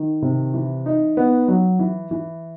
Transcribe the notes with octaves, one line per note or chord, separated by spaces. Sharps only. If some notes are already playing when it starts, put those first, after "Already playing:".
Already playing: D#3
C3
E3
D#4
B3
F#3
E3
E3